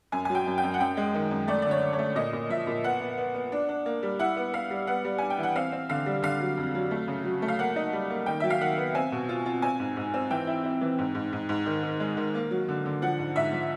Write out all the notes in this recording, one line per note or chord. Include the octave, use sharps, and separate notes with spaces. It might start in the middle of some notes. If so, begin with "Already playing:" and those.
F#2 G#5
F#3 G#5
G5
F#2
G5
F#2
F#5
F#2 G5
G#3
D#3
F#2
A3 D5
D3 D5
C#5
D4
C#5
A3
A#2 D#5
A#2
F3 E5
A#2
B3 F#5
B3
B3
B3
D4
D4
A#3
G3
E4 F#5
B3
B3 F5
G3
B3 F#5
G3
D4 G#5
G5
E3 F#5
C4 F5
C4
D3 F5
G3
D3 F5
F#3
F2
F#3
A3
C#3
F#3
A3
F5
A#3 F#5
D#4
G3
A#3
D#3 G5
F#3 E5
F5
D#3 F#5
B3
C4 G#5
B2
F4
F4
C4 G#5
G#2
G#2
C4
E3 G5
E4
E4
E3
G#2
G#2
G#2
G#2
D#3
D#3
G#3
D#3
A#3
F#3
D3
D3
F3 F#5
G#2
G#2 E5
F3